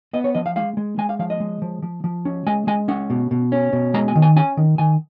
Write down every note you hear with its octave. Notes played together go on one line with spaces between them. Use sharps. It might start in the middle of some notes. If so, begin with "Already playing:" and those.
B3 D#5
C#5
F3 D#5
F5
G#3 F5
G#3
G#3 G#5
F5
F3 F5
D#5
G#3
F3
F3
F3
C#4
G#3 G#5
G#3 G#5
C#4 F#5
B2
B2
C#4
B2
G#3 A#5
G#5
D#3
G#5
C#4 G#5
D#3
D#3 G#5